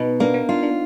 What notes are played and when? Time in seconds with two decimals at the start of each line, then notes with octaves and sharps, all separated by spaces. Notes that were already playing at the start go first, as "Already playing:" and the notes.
Already playing: B2 D#4
0.20 A#3 D4
0.34 B3
0.49 D4 F4
0.63 D4